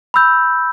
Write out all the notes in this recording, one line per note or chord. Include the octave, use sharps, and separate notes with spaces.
B5 E6 G6